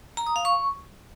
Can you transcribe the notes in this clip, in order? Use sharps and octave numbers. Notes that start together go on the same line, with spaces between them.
A#5
D#6
F5
C#6